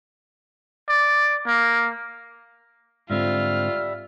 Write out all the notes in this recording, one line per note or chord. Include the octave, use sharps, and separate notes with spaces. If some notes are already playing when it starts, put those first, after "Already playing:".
D5
A#3
G#2 D3 G3 C4 F4 E5 F6